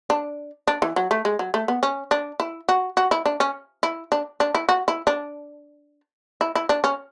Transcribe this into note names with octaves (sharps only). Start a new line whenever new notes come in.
D4
D4
E3
F#3
A3
G#3
F#3
A3
B3
C#4
D4
E4
F#4
F#4
E4
D4
C#4
E4
D4
D4
E4
F#4
E4
D4
E4
E4
D4
C#4